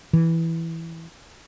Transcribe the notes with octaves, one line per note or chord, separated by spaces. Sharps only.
E3